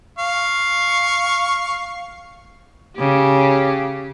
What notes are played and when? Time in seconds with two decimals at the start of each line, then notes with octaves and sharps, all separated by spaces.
0.19 F5 C#6
2.97 C#3 G4